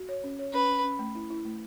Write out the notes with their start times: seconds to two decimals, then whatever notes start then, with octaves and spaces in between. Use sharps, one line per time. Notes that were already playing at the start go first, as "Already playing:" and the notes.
Already playing: F#4
0.09 C#5
0.24 C#4
0.39 C#5
0.54 C#4 B4
0.69 C#4
0.84 C#4
0.99 A3
1.15 E4
1.30 E4
1.45 A3